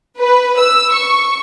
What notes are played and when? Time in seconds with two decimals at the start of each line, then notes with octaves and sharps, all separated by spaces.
0.19 B4
0.59 E6
0.93 C#6